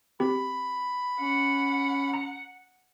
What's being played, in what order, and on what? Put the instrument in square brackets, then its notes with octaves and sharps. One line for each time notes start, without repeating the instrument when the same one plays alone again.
[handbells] C4 G4 [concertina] B5
[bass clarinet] C#4 [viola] F#5
[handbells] A#5